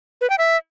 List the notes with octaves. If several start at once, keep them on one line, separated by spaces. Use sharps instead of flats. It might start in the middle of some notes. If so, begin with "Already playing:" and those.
B4
G5
E5